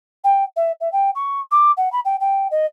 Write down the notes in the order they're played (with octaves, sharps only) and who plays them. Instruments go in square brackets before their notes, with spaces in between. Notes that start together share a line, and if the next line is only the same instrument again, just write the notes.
[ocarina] G5
E5
E5
G5
C#6
D6
F#5
B5
G5
G5
D#5